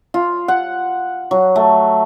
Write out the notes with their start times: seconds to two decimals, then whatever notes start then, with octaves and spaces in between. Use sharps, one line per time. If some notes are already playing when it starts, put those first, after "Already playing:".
0.14 F4
0.48 F#5
1.31 F#3
1.56 A3